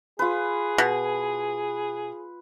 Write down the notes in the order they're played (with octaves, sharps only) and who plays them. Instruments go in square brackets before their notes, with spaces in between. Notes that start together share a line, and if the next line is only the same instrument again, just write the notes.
[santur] F4 B4 [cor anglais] G#4
[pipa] B2